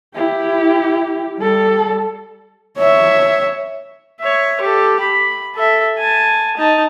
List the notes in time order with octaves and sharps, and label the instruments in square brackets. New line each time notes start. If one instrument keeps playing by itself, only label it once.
[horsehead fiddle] E4 G4
G3 A4
C#5 E5
[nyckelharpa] C#5 E5
G4 A4
B5
A4 E5
G#5 A5
D#4 A5